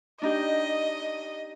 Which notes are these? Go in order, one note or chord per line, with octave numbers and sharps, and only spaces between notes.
D4 D#4 G4 D#5